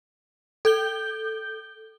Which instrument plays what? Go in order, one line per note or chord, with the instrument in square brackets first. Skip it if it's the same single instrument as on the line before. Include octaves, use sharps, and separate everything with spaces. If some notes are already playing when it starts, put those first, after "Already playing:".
[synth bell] A4 G6 G7